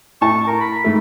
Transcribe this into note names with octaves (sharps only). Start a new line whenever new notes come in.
A2 A5 C#6
A#4
B5
G#2 A3